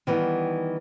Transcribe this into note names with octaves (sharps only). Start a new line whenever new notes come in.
D#3 E3 G3 B3